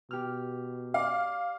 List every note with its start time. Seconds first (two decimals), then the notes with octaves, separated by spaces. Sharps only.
0.11 B2 G4 F6
0.94 D5 F5